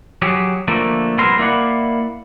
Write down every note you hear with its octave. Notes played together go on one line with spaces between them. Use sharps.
F#3 G4 G#4
D3 F3 A3 A#3
C2 B2 B3 E4 A#4 C6
A#3 E4 D5 F#5